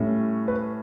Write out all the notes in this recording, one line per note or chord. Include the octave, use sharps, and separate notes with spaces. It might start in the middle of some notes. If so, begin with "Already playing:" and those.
Already playing: A2 G3 C#4
B4